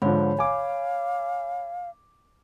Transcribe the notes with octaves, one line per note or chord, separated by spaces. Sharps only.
G#2 D3 F3 C#5 B5
F5 G#5 D6